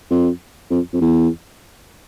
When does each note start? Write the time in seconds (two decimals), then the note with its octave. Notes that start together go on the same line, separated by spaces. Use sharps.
0.11 F2
0.70 F2
0.93 F2
1.01 E2